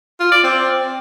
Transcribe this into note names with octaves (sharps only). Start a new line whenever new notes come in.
F4
D5
C4